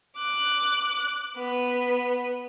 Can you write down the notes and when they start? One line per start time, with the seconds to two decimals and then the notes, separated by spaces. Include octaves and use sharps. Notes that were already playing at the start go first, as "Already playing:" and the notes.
0.17 D6 F#6
1.37 B3